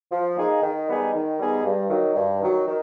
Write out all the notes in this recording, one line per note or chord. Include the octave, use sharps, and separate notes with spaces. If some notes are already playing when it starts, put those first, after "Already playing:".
F3
A#3 D#4 G#4
D#3
G3 B3 D#4 G#4
D#3
G3 B3 D#4 G#4
G2
D#3 F#3
G2
D#3 F#3
D#3